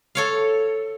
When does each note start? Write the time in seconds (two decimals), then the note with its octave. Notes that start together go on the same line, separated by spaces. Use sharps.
0.15 A4 C#5 F5